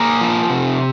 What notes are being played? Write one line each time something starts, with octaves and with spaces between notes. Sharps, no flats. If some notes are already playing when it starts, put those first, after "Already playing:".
Already playing: A#3 G#4
F3
C3